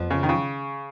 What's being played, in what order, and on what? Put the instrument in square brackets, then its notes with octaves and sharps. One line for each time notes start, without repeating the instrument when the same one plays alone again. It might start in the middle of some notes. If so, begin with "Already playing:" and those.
Already playing: [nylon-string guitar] F2 F3 B3
[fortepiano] C#3
D#3
C#3